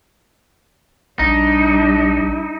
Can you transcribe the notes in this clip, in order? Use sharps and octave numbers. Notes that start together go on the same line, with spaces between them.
A#1 G3 D4 D#4